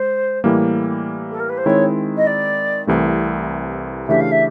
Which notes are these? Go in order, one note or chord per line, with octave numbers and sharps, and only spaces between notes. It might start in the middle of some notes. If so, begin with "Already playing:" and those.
Already playing: G#3 C5
A2 E3 G3 A#3
A4
A#4
B4
C5
D#3 G#3 C4 E4 C#5
D#5
D5
C2 C3 E3 A3
C#3 E3 A3 D4 G4 E5
F5
E5